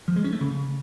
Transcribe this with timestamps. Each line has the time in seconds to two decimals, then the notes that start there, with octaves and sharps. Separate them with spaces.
0.08 F3
0.16 G#3
0.24 C#4
0.33 A3
0.41 C#3